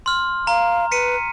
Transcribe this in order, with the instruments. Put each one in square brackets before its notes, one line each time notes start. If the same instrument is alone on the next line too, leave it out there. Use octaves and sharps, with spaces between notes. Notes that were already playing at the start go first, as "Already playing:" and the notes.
[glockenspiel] C6 F6
[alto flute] F5 [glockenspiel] A#5
[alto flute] B4 [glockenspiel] B6 C#7 D#7